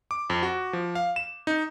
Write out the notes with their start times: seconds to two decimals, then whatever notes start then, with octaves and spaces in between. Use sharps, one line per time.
0.11 D6
0.30 F2
0.43 F#4
0.73 F3
0.95 F5
1.16 E7
1.47 D#4